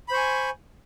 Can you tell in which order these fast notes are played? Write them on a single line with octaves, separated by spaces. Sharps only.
B5 C5 C#6 G#5